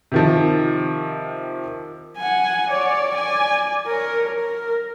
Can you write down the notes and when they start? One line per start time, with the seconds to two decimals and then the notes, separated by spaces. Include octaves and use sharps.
0.12 C3 D#3 F3
2.17 F#5 G#5
2.70 C#5 D5
3.14 D5 G#5
3.87 A#4 C#5
4.39 A#4